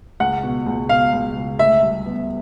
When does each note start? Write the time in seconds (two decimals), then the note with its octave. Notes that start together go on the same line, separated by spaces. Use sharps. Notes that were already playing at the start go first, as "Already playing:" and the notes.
0.20 C#2 F#5
0.43 B2
0.66 C#2
0.89 B2 F5
1.13 C#2
1.36 C#2
1.59 D2 E5
1.82 G3
2.06 B3